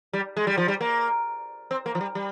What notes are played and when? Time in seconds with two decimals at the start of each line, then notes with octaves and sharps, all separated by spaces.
0.13 G3
0.37 G#3
0.47 G3
0.58 F3
0.68 G3
0.81 A#3
1.71 C4
1.86 A#3
1.95 F3
2.01 G3
2.15 G3